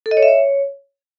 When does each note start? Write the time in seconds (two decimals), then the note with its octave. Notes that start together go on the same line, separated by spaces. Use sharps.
0.06 A4
0.11 D#5
0.17 C#5
0.23 E5
0.28 C#5